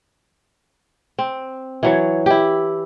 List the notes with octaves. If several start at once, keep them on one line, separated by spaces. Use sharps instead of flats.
C4
E3 F#3 C#5
E4 G4